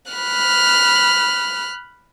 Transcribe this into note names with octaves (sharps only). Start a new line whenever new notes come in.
B5 F6 F#6